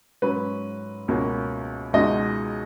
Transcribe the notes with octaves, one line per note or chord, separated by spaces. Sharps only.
G#2 F#3 C#4 B4
C#2 B2 A#3 C#4
C#2 B2 G#3 D#4 D#5